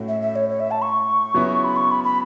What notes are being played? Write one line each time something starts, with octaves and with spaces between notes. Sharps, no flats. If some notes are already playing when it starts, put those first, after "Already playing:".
Already playing: A2 A3 C#4 F#4
E5
E5
C#5
C#5
E5
A5
C#6
C#3 F#3 B3 E4
B5
C#6
B5
B5